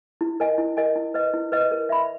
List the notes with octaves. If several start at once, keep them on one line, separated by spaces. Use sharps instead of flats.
E4
A#4 D#5 G#5
E4
A#4 D#5 G#5
E4
B4 D#5
E4
B4 D#5
A#4
E5 B5